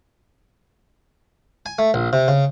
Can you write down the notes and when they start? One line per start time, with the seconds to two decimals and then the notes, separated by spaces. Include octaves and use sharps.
1.66 G#5
1.79 A3
1.94 A#1
2.13 C3
2.28 C#3